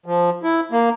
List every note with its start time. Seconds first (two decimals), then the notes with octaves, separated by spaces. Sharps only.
0.06 F3
0.43 E4
0.72 A#3